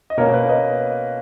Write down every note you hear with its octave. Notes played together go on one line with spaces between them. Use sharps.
D#5
B2 A#3 C#4 A#4 C#5
B4
B4 D#5